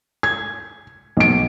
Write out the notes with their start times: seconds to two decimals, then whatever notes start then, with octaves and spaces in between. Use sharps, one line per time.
0.23 G#6
1.17 B1 D7